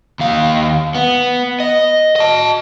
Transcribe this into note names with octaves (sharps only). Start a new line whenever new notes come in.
D#2 F5
B3
D#5
D#5 A5